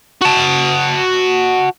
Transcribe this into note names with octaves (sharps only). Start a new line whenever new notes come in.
F#4 A5